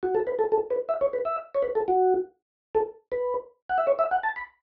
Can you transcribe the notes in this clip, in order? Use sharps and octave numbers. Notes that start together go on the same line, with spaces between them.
F#4
A4
B4
A4
A4
B4
E5
C#5
B4
E5
C#5
B4
A4
F#4
A4
B4
F#5
E5
C#5
E5
F#5
A5
B5